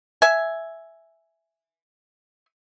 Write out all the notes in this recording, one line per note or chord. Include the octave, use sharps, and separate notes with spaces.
E5 G#5